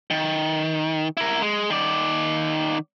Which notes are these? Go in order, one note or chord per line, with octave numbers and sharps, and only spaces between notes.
D#3
E4 A#4
G#3
D#3 D5